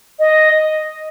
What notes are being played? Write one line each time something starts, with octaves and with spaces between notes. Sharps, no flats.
D#5